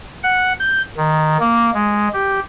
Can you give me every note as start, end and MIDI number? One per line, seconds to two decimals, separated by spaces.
0.24 0.53 78
0.60 0.82 91
0.97 1.37 51
1.40 1.70 58
1.74 2.08 56
2.13 2.39 67